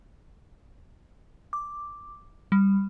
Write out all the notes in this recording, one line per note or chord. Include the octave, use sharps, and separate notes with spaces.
D6
G3